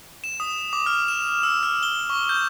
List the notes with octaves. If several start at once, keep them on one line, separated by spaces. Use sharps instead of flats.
E7
D#6
D6
F6
E7
E6
F6
G7
C#6
G6